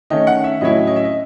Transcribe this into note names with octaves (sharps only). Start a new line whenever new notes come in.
D#3 A3 C#4 D#5
F#5
E5
A2 F#3 C#4 E4 D#5
D#5
E5
D#5